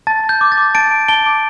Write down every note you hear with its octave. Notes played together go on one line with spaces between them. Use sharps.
A5 A6
A5
G6
D6
A6
D6
A5 A6 D7
A5
A5 D7 G7
D6